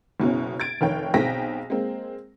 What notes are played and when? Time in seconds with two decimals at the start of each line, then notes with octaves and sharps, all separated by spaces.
0.20 F#1 B2 C#4
0.60 G#6 A6 D7
0.81 F1 D#3 C#5 G5
1.14 B1 C4 G#4 G5 A#6 B6
1.70 G#3 A#3 C4